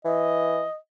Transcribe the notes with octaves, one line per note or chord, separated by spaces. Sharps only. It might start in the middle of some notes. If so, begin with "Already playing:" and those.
E3 D#5